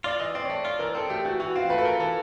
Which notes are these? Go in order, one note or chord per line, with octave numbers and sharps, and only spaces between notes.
F4 D5
E3 D#5
C4 D5
C#5
A3 D5
F4 D5
E3 A#4
C4 A4
A3 G4
E3 F#4
E3 F#4
C4 F4
A3 B4
A4
E3 A#4
E3 A4